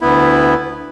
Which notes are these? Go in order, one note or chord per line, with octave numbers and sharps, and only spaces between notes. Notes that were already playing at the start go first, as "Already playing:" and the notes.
D2 B3 E4